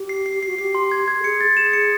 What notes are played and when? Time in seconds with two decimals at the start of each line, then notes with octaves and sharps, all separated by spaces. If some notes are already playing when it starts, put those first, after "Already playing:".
Already playing: G4
0.09 C7
0.26 C7
0.43 F#4 C7
0.58 G4 C7
0.75 C6
0.92 G#6
1.08 G#6
1.20 A4
1.24 G#4 C#7
1.41 A6
1.57 G#4 E7
1.73 C#7